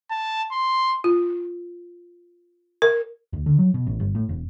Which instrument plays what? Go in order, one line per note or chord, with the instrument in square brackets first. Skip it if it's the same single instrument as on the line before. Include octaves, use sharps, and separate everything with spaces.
[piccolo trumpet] A5
C6
[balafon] F4
A#4
[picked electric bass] D2
D3
F#3
B2
A1
G1
A2
E1